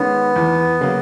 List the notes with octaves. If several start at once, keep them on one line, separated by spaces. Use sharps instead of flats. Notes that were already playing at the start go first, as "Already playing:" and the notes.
Already playing: D#3 G#3 B3 C#4
E2
C#3 F#3 A#3